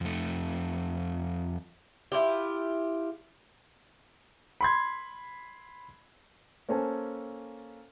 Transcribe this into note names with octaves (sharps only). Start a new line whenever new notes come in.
F2 A3
E4 F4 G4
B5 C6 G#6
A#3 C#4 A4 C5 G#5 A5